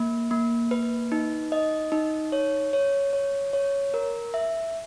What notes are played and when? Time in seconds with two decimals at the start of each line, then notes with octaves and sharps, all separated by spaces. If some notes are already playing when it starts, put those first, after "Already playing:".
Already playing: A#3
0.31 A#3
0.71 B4
1.12 D#4
1.52 D#5
1.92 D#4
2.32 C#5
2.73 C#5
3.13 C#5
3.53 C#5
3.94 A#4
4.34 E5